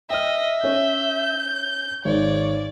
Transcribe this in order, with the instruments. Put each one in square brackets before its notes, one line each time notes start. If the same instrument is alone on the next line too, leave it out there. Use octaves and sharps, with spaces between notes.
[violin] D#5 [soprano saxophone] E5 [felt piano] G5 F6
[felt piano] C#4 C#5 [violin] G6
[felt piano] G#1 G#2 [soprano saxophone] C#5 [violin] D5